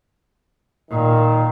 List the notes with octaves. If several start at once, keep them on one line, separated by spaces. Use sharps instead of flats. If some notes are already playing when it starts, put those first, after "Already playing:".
A#2 D#3